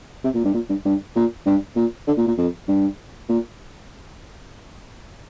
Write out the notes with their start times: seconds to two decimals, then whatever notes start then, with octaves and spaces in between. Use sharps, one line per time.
0.24 C3
0.34 A#2
0.44 G2
0.54 A#2
0.69 G2
0.85 G2
1.16 A#2
1.46 G2
1.76 A#2
2.07 D3
2.17 A#2
2.28 A#2
2.38 F2
2.68 G2
3.29 A#2